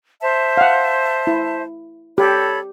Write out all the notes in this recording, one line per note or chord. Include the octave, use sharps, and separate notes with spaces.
C5 E5 A5
F5 F#5
E4
G4 A4 C#5 B5